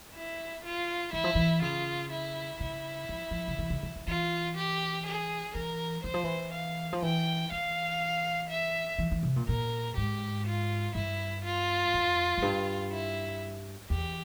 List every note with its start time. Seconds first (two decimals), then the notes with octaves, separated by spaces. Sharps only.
0.15 E4
0.64 F4
1.13 E3 E4
1.24 F3
1.35 E3
1.62 C#3 F4
2.11 E4
2.60 C#3 E4
3.09 F3
3.31 F3
3.48 C#3
3.59 E3
3.70 C#3
3.83 E3
3.96 E3
4.07 E3 F4
4.57 G4
5.07 G#4
5.55 E3 A#4
6.04 E3 C5
6.14 F3
6.24 E3
6.53 F5
6.93 F3
7.02 E3 G5
7.52 E3 F5
8.49 E5
8.99 E3
9.11 E3
9.23 C3
9.36 A#2
9.48 A#2 A#4
9.97 G#2 G4
10.47 F4
10.95 G2 E4
11.44 F4
11.94 F2
12.38 F2
12.42 G2
12.91 E4
13.90 E2 G4